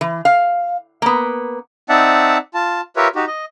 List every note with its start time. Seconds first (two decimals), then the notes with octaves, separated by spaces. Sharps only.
0.01 E3
0.25 F5
1.02 A#3 B3
1.89 C4 D#4 D5 E5 F#5 A5
2.54 F4 A5
2.96 F4 G4 A#4 B4 C#5 E5
3.15 D#4 F#4 G4
3.28 D#5